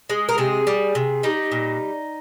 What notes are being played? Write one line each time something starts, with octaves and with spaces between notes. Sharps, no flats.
G#3
A#4
C3 G#4
G3
C3
G3 D#4
A#2